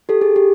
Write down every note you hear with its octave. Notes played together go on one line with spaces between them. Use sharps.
G4 A4
G#4
G4